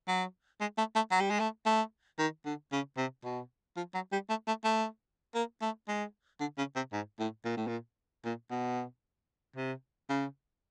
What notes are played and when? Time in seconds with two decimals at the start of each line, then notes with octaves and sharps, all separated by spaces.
0.08 F#3
0.60 G#3
0.78 A3
0.95 A3
1.11 F#3
1.20 G3
1.30 G#3
1.40 A3
1.66 A3
2.19 D#3
2.45 D3
2.72 C#3
2.97 C3
3.24 B2
3.77 F3
3.94 F#3
4.12 G3
4.29 A3
4.47 A3
4.64 A3
5.35 A#3
5.62 A3
5.88 G#3
6.40 D3
6.58 C#3
6.76 C3
6.93 G#2
7.19 A2
7.45 A#2
7.57 A2
7.67 A#2
8.25 A#2
8.51 B2
9.56 C3
10.10 C#3